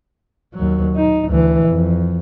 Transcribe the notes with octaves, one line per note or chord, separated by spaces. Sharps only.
D#2 F#3
D#4
D2 E3
F2